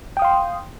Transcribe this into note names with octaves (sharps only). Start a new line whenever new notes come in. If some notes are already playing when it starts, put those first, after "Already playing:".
F5 G5 C6 D#6